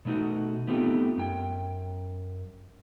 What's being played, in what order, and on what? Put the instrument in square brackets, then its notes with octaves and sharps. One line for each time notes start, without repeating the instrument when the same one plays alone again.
[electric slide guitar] B2 A3 C#4 D#4 F#4
A3 B3 C4 D#4 F4 G4
F#2 G5